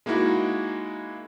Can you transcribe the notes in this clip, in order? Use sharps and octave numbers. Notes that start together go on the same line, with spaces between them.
G#3 A#3 D#4 E4 F#4